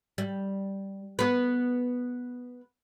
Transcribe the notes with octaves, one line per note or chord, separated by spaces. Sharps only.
G3
B3 B4